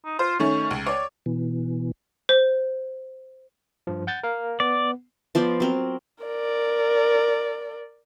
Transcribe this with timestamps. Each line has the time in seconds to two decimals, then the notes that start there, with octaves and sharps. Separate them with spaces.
0.05 D#4
0.19 F4 C5
0.40 D#3 A3 C#4 C#5
0.71 C#2
0.86 C#5 D5
1.26 B2 E3
2.29 C5
3.87 G2 F3
4.07 F#5 G6 A6
4.23 A#4 F5
4.60 B3 D5
5.35 F3 B3 C5 D5
5.60 F#3 C4 A#4
6.24 A#4 D5